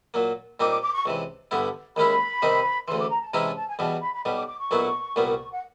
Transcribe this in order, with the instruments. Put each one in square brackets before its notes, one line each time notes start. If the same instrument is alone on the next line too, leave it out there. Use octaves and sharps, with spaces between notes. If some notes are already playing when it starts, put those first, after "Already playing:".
[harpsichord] A#2 F#3 A#3
[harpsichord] A#2 G3 C4 D#4 [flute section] D6
[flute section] D6
D6
C#6
[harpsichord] C#2 C3 E3
G2 D3 G3 B3 E4
[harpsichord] D#2 D#3 G#3 C#4 E4 [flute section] B5
[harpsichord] C3 D#3 G3 C4 D#4
[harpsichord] D2 C#3 E3 [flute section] C6
[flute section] D6
A#5
A5
[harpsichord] C3 E3 G#3 C#4 E4 [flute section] A#5
[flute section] A5
A5
G#5
[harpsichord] E2 B2 G3 [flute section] A5
[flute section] B5
B5
[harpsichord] B1 B2 G3 [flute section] B5
[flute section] D6
D6
C#6
[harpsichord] B1 A#2 F#3 B3 E4
C2 A#2 G3 B3
[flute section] F#5